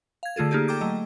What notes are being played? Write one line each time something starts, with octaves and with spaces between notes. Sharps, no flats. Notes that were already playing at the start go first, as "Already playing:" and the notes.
F5 G#6
D3 A3 F4 G#4 A4
A#3 D#4 G4 G#4 D5
A4 G5 A#5 D6 G6
F#3 A3 D#5